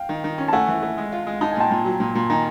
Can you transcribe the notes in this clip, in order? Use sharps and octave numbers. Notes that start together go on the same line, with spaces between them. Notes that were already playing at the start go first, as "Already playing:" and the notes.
Already playing: F5 G5
D#3
D#3
C#4
A5
A3 F#5 G#5
E3
A3
G#3
F4
G#3
D#4 A5
G#5
A#2 G5 A5
A#2
F#3
A#2
A#2
D#3 G#5 A#5